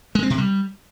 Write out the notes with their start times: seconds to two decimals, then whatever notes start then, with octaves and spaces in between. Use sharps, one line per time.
0.15 G#3
0.23 C4
0.30 C3
0.38 G3